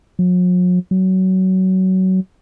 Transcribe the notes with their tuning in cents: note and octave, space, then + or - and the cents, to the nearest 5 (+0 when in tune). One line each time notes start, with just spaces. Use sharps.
F#3 -45
F#3 +20